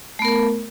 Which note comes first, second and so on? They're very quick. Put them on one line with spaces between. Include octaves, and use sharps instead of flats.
A3 B3 A#4